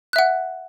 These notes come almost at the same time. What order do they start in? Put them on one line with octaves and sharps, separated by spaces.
F#6 E5 F#5